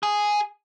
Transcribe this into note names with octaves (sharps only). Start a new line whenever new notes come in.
G#4